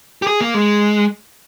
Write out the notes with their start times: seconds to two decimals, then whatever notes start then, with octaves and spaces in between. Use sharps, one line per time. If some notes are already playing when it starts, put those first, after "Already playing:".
0.22 G4
0.27 G#4
0.41 A#3
0.54 G#3